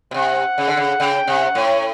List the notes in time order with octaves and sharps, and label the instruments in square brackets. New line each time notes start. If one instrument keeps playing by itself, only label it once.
[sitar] B2
[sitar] C3 [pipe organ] F#5
[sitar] C#3
D3
C#3
[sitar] C#3 [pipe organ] G5
[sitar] C3 [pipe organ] F#5
[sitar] A2 [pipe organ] C#5